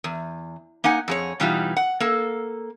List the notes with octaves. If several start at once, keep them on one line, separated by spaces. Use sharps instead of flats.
E2
A#3 D#4 F#5 G#5
F2 G#4 C#5
B2 E3 G3 D#4 F4 F#4
F#5
A#3 A4